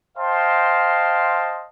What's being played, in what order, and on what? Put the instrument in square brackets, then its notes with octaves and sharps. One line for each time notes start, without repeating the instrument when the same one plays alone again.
[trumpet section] C5 D#5 F5 G5 A5 C6